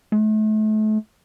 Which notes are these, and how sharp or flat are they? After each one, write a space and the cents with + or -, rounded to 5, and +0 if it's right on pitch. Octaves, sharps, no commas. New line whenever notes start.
A3 -35